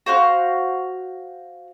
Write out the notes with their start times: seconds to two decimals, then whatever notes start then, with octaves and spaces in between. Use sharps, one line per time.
0.06 F#4 C5 F5 F#6